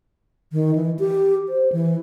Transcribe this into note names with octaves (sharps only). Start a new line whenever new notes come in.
D#3
E3
G4
C5
E3